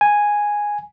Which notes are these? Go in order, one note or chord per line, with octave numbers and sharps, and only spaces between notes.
G#5